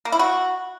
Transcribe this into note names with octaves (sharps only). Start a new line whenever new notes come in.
A#3
E4
F#4